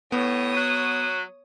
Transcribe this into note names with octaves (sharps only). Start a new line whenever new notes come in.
A2 B3 C#5 D#6
F#3